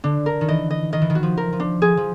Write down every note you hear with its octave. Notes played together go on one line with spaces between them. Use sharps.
D3 D4
A#4
D#3
E3 D#5
D#5
D#3 D#5
E3
D#3
F#4
F3
A#4
F3
D4
F3 G#4
F3